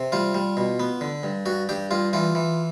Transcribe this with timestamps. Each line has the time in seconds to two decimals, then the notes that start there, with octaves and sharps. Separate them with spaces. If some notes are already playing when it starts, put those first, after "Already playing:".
Already playing: C3
0.12 G3 F4
0.34 G3
0.57 B2
0.80 B3
1.01 D3
1.23 G2
1.46 G2 F#4
1.69 G2 G4
1.91 G2 F4
2.13 E3 F4
2.35 E3